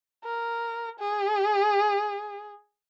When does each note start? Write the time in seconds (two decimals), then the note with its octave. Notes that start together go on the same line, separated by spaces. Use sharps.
0.24 A#4
0.99 G#4